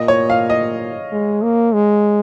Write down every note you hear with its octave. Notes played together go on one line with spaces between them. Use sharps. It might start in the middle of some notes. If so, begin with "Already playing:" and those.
Already playing: A#2 D#5
C#5
F5
D#5
G#3
A#3
G#3